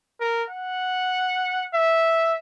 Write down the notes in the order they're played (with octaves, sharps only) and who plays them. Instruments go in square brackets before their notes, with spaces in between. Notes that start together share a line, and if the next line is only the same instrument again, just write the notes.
[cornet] A#4
F#5
E5